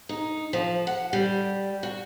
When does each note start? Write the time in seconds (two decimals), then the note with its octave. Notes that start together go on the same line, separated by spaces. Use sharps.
0.09 D#4
0.53 F3
0.87 F#5
1.13 G3
1.83 F#4